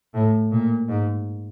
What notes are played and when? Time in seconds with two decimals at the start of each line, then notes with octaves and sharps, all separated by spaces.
0.14 A2
0.51 A#2
0.89 G#2